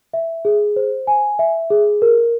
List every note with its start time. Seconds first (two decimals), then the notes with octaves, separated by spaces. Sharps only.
0.14 E5
0.45 G#4
0.76 C5
1.07 G#5
1.39 E5
1.70 G#4
2.02 A#4